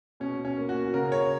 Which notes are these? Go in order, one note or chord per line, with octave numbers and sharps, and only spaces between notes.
B2 C#4
C#4
A#3
F#4
C#3 A#4
C#5